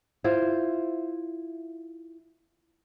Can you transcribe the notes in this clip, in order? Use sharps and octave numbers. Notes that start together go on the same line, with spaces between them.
E4 F4 C5